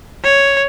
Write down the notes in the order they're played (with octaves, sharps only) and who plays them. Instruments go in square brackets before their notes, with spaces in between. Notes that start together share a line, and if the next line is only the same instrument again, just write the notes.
[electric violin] C#5